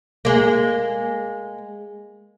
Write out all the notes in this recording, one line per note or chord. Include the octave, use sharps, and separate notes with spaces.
G#3 A#3